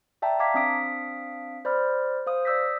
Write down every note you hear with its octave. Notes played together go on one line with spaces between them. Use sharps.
D5 E5 G5 A5 A#5
F5 A5 A#5 D6 G#6 B6
C4 D4 F5 D#6 B6 D7
C5 D5 B5 F6
C5 F5 D#6
D5 D#6 E6 G6 A#6 B6